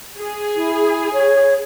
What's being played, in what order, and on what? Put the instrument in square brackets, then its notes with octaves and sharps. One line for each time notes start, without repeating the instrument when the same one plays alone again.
[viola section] G#4
[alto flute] E4
C#5